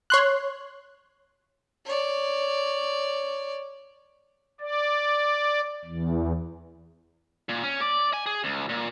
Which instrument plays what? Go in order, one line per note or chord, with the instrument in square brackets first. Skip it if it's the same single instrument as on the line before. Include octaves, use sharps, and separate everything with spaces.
[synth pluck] C#5 C6 F#6
[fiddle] C#5 D5
[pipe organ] D5
E2
[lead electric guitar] A#2
C#4
D5
G#5
G#4
C#2
A#2